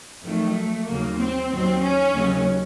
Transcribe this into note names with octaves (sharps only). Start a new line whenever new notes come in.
F2 D#3 F#3 A3
D#2 C#3 F#3 A#3
C4
D#2 D#3 F#3 C4
C#4
D#2 C#3 F#3